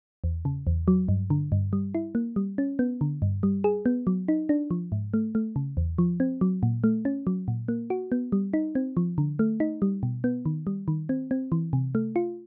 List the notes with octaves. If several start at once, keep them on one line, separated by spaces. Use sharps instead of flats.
E2
C#3
E2
F#3
G2
D3
G2
G3
E4
A#3
G3
C#4
B3
D3
G2
G3
G#4
B3
F#3
D#4
D4
F3
G#2
A3
A3
C#3
E2
F3
C4
F#3
A#2
A3
C#4
F#3
A#2
A#3
F#4
B3
G3
D#4
C4
F3
D3
A3
D#4
G3
B2
B3
D#3
G3
D#3
C4
C4
E3
C3
A3
F4